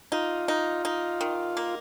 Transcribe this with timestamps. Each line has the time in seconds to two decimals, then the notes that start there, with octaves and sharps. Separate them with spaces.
0.12 D#4 F4
0.48 D#4
0.85 D#4
1.21 D#3
1.57 A#3